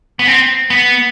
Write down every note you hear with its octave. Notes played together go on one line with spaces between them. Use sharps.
B3
C4
B3